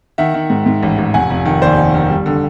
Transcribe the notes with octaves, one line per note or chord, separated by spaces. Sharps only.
D#3 E5 F#5
D#3
G#2
G#2
A1
A1
F1 F#5 G#5
F1
D#3
D#2 C5 D5
D#3
D#3
G3
D3